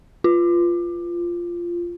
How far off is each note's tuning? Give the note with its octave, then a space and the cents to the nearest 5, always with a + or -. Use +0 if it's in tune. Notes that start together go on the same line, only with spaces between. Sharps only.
F4 -10